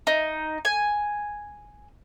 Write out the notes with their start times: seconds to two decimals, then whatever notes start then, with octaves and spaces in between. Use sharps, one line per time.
0.07 D#4
0.65 G#5